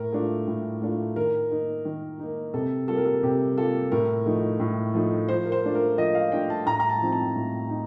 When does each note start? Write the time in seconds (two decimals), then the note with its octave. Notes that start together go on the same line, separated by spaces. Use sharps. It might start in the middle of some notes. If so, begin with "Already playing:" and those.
Already playing: A2 A#4
0.13 A3 D4 F4
0.48 A2
0.82 A3 D4 F4
1.16 D#3 A#4
1.50 A#3 D#4
1.85 D#3
2.20 A#3 D#4
2.54 C3 A4
2.88 G3 A#3 F4 A4
2.97 A#4
3.05 A4
3.23 C3 G4
3.58 G3 A#3 F4 A4
3.92 A2 A#4
4.26 F3 A3 D#4
4.60 A2
4.94 F3 A3 D#4
5.29 F3 C5
5.45 A#4
5.52 C5
5.64 A3 D4 F4
5.75 A#4
5.98 F3 D#5
6.15 F5
6.32 A3 D4 F4 G5
6.50 A5
6.67 A2 A#5
6.80 A#5
6.89 A5
7.01 F3 C4 D#4
7.12 A5
7.36 A2
7.70 D#4